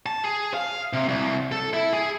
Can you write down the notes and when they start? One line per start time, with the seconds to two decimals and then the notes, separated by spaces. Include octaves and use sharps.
0.06 A5
0.24 G#4
0.54 F5
0.93 C3
1.08 C2
1.52 A4
1.73 E4
1.93 G#4